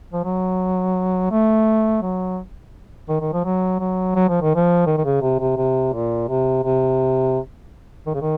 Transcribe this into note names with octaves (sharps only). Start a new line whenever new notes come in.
F3
F#3
A3
F#3
D#3
D#3
F3
F#3
F#3
F#3
F3
D#3
F3
D#3
D#3
C#3
C3
C3
C3
A#2
C3
C3
D#3
C#3
D#3